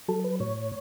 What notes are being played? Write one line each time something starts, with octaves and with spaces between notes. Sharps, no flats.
F#3 A4
B4
A2 C#5